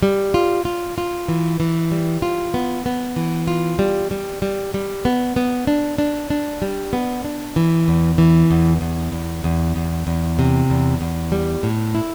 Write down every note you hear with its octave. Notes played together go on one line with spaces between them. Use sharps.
G3
F4
F4
F4
E3
E3
G3
F4
B3
B3
E3
F4
G3
G3
G3
G3
B3
B3
D4
D4
D4
G3
B3
D4
E3
E2
E3
E2
E2
E2
E2
E2
E2
C3
E2
E2
G3
A2
E4